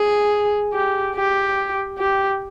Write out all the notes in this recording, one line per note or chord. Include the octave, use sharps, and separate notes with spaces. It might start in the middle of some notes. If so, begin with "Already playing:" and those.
Already playing: G#4
G4
G4
G4